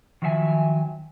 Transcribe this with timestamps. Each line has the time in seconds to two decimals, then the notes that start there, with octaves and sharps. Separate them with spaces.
0.22 D#3 F3 F#3 E5 F5 G#5